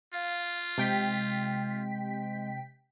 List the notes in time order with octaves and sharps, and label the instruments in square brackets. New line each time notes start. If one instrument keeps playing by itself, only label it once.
[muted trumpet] F4 [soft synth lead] F5
[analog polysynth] C3 G5 B6 [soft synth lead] G#3